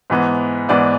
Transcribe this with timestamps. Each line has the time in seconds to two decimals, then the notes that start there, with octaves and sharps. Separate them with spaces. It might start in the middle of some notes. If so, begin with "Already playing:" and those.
0.10 G#2 E3 B3
0.69 G#2 E3 B3 D5